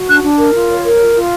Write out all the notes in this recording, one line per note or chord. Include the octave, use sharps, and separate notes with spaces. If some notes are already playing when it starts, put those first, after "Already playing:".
Already playing: F#4
D4 F#6
D4
A#4
F4
C#5
A#4
F4
F4